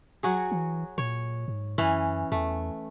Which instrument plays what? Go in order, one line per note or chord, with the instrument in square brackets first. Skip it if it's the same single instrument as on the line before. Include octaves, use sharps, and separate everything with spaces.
[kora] F#3 F#4 G#4
[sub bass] E3
[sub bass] A#2 [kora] C#5
[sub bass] G#2
[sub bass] F#2 [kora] E3 C#4
[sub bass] E2 [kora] A3